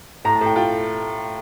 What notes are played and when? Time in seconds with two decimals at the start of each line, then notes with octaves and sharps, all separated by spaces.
0.25 A2 A#5
0.35 A5
0.41 A2 G5
0.56 F4 G5